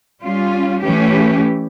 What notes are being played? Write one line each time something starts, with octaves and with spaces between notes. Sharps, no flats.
G3 C#4 F4
E3 A3 C#4 G4